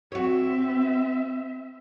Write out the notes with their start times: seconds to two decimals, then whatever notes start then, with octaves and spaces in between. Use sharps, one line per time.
0.12 C4 F#4 C#5 E5